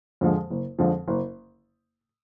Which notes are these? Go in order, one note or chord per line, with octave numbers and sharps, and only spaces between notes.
F2 D3 F3 G#3
F#1
F2 D3 F3 G#3
F#1